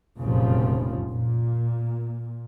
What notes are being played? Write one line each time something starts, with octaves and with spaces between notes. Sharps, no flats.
F1 C#2 F#2 A#2 C#3 F3
A#2